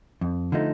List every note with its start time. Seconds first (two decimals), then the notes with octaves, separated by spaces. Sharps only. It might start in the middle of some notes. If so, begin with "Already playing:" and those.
0.21 F2
0.52 D3 F3 A3 D#4